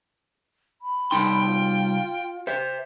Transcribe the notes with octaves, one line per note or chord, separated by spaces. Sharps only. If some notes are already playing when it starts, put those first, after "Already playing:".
B5
C2 D#4 G5 C6
F4
C5 E5